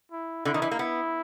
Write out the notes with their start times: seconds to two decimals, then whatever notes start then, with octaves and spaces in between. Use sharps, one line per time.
0.11 E4
0.45 D3 E4
0.54 D#3
0.62 E3
0.71 A#3
0.79 B3 E4